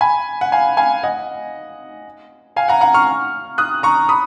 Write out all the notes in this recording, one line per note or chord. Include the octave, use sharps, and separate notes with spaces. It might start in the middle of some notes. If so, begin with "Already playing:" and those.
G#5 B5
F#5
F5 G#5
F5 G#5
D#5 F#5
F5 G#5
F#5 A#5
F#5 A#5
C#6 F6
D#6 F#6
A#5 C#6
B5 D#6